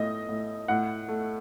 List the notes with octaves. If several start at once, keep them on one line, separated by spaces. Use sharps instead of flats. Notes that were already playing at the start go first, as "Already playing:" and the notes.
Already playing: A2 A3 D#5
A2
A2 F#5
A3